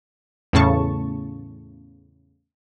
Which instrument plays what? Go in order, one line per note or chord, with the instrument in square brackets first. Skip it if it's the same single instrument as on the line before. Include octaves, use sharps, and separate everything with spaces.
[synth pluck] E2 A2 C#3 A5 C#6